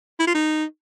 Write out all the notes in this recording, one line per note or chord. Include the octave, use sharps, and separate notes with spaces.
E4
F4
D#4